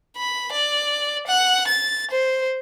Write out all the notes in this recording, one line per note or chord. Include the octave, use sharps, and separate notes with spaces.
B5
D5
F#5
A6
C5